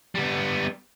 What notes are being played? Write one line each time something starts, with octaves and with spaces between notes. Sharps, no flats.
G3 B3